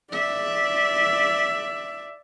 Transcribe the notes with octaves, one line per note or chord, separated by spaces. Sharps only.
D5 E5